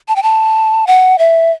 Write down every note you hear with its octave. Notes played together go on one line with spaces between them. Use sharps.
A5
G5
A5
F#5
E5